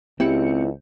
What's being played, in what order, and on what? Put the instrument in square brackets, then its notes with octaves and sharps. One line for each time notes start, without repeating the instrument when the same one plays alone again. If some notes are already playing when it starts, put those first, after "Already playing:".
[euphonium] C#2 [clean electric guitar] C4 [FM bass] E4 [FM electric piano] G4 C#7